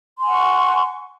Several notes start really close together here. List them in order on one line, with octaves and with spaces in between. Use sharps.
C6 G#5 F#5 C#6